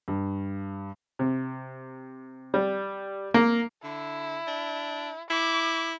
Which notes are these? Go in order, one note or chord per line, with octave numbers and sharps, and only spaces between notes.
G2
C3
G3
A#3
D3 E4
D4
E4 D6